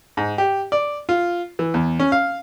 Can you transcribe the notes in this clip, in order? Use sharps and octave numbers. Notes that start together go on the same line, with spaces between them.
G#2
G4
D5
F4
E3
E2
C#4
F5